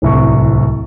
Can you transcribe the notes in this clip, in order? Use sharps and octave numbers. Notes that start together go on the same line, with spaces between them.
D1 C2 C#6